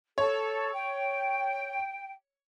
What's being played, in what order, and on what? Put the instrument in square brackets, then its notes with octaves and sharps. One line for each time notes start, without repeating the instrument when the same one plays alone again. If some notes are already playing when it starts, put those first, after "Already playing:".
[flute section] A4 [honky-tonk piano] C#5
[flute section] G5